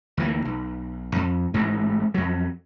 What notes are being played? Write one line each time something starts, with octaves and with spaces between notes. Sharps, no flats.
D2 E3 A#3
B1
F2
A1 G#2 E3 A3
F2 F#3